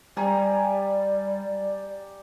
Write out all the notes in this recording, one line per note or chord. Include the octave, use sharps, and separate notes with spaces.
G3 G4 D5 G#5 A#5